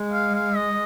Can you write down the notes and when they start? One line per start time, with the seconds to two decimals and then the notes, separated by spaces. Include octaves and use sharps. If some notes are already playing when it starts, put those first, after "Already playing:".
Already playing: G#3
0.13 F5
0.35 F5
0.56 D#5